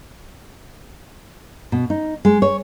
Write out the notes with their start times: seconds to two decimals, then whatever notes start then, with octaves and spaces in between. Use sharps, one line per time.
1.72 B2
1.90 D#4
2.25 G#3
2.42 C#5